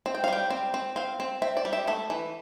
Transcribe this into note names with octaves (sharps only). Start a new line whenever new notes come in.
C4
G5
F5
G3 G5
C4
C4
C4 F5
C4
C4 E5
D5
G3
E5
A3 E5
E3